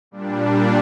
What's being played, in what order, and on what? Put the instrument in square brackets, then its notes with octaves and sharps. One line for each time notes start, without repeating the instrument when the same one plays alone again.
[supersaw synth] A#2 G3 D4